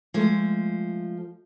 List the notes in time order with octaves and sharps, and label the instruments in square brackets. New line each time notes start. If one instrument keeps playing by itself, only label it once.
[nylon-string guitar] F3 G#3 A3